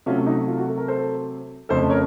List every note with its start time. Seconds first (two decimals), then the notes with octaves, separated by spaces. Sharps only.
0.06 C3 F#3 A3 C#4 F4
0.26 D#4 F#4
0.48 F4
0.58 F#4
0.69 A4
0.77 A#4
0.88 A4 C5
1.69 F2 C#3 A3 A4 C5
1.89 A#4 C#5